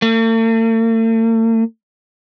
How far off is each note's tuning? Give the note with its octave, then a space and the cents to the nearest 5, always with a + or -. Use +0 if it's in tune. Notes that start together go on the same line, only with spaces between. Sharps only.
A3 +45